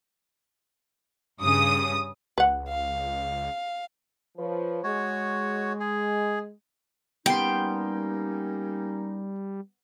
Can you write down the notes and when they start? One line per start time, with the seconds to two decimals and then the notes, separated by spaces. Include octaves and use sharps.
1.42 G2 C#3 D#6
2.38 C#2 B4 F#5
2.68 F5
4.38 F3 B4 C#5
4.84 G#3 F#4 C#5
5.80 G#4
7.26 G3 A#3 B3 C#4 D#4 G5 C6